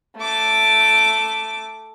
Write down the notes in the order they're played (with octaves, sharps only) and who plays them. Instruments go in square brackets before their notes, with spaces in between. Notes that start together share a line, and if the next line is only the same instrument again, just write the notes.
[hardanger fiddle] A3 D6